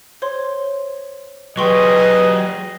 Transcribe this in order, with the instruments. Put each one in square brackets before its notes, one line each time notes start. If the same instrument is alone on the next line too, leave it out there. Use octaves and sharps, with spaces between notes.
[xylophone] C5 C#5 C6
[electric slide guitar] F#3 G4 [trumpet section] G#4 D#5 [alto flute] B4 [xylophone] G5 C6 C#6